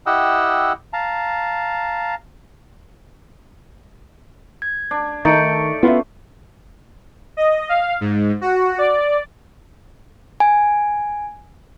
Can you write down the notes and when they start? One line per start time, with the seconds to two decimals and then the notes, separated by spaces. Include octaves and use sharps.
0.06 E4 G4 D#5 F#5 G5 E6
0.93 F5 A5 A#5
4.62 G#6
4.91 D4
5.25 D#3 A3 D#4 A6 C#7 D7
5.83 B3 C#4 F4 E5
7.37 D#5
7.69 F5
8.01 G#2
8.41 F#4
8.78 D5
10.40 G#5